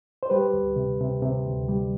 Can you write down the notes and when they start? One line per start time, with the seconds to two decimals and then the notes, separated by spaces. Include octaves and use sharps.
0.23 C5
0.30 G3 G4 B4
0.53 D2
0.76 C3
1.00 C3
1.22 C3
1.46 D2
1.68 G3